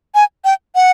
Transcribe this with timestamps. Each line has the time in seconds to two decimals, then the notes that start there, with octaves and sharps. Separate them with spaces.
0.15 G#5
0.45 G5
0.75 F#5